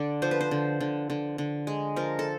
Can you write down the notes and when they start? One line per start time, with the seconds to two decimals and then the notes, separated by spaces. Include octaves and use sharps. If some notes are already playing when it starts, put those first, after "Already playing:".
Already playing: D3 D5
0.22 F3 C5
0.31 B4
0.41 C5
0.51 D3
0.80 D3
1.10 D3
1.38 D3
1.67 G#3
1.96 F3 A#4
2.19 A4